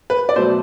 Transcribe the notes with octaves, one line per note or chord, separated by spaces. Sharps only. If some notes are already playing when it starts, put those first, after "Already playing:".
B4
D5
B2 F#3 A3 C5